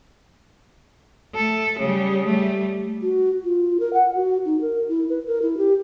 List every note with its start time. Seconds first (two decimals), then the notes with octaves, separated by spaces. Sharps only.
1.35 A3 A4
1.79 C#3 G3
2.26 G3 A3
3.02 F#4
3.44 F4
3.80 A#4
3.93 F#5
4.14 F#4
4.45 D#4
4.61 A#4
4.89 E4
5.09 B4
5.27 A#4
5.42 E4
5.58 G4